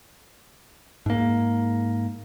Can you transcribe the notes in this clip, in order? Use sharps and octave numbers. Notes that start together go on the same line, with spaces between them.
G#2 A#3